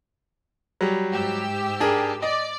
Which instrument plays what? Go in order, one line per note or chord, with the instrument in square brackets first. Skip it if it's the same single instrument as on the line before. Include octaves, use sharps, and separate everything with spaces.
[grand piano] F#3 G3
[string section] G#2 G4 E6
[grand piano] D4 G#4 A#4
[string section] D5 [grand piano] D#5